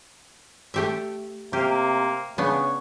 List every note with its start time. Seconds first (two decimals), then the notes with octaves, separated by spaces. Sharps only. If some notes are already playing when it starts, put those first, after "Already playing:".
0.74 A3 G4 E5
1.53 C3 A#3 G4
2.38 C#3 B3 D4 C#5